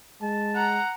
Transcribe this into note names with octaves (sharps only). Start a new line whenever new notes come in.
G#3 A5
F#5 A#5